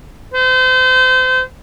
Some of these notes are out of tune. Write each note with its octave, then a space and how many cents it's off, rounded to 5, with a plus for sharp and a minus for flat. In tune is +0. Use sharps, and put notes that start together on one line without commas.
C5 -35